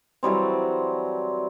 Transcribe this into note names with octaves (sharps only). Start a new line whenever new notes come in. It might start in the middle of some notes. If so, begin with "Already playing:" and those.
E3 F#3 G3 C4